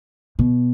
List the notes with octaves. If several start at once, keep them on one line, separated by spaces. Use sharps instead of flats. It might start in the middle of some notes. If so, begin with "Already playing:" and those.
B2